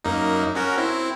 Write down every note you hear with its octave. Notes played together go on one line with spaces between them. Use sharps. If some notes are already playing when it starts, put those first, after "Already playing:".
F#2 A#3 D#4
C#4 F#4 A#4
C4 E4